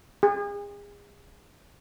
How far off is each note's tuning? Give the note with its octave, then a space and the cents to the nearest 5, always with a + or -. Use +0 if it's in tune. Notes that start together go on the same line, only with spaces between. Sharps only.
G#4 -35